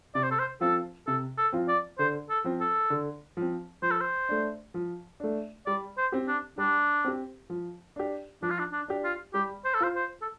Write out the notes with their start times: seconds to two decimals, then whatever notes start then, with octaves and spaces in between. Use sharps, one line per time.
0.15 C3 D5
0.23 C5
0.31 A4
0.39 C5
0.61 F3 C4 F4 A4
1.07 C3 A4
1.38 A4
1.52 F3 C4 F4
1.68 D5
1.99 D3 C5
2.30 A4
2.44 F3 C4
2.61 A4
2.90 D3
3.37 F3 C4
3.82 F3 C5
3.91 A4
4.01 C5
4.29 A3 D4
4.74 F3
5.20 A3 D4
5.66 G3 D5
5.97 C5
6.12 C4 G4
6.28 D4
6.58 G3 D4
7.04 C4 G4
7.50 F3
7.96 D4 G4
8.42 F3 D4
8.50 F4
8.59 D4
8.72 D4
8.88 D4 G4
9.04 F4
9.33 G3 G4
9.65 C5
9.74 A4
9.80 F4 C5
9.96 C5
10.22 A4